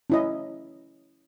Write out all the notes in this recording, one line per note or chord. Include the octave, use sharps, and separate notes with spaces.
C#4 E4 D#5